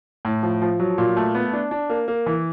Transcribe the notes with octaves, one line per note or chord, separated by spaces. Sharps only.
A2
F3
F3
F#3
A#2
A3
B3
D4
D4
A#3
A#3
E3